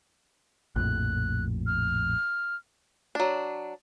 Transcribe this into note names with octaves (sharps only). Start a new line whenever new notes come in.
A#1 F2 A2 F#6
F6
F#3 D4